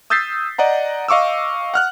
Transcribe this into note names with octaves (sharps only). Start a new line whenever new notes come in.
D#6 E6 G6 A6 B6 C7
D5 D#5 F#5 A#5
D#5 F5 C#6 D6 E6
F#5 F6 F#6